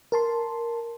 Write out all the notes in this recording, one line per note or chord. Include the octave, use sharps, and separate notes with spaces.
A#4 A5 C6